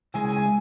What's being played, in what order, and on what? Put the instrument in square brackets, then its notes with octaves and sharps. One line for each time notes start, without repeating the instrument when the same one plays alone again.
[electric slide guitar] C#3 G#3 E4 G#4 [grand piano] G#5
[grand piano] G#5
G#5